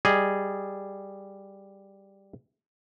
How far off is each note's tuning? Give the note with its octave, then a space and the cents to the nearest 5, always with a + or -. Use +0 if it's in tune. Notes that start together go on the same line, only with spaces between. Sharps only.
G3 +0 G#4 -5 D#5 +0